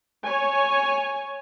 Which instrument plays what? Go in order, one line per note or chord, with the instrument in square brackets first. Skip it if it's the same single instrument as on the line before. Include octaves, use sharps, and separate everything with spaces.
[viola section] C#5 G#5